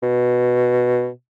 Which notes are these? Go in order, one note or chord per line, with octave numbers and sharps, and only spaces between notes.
B2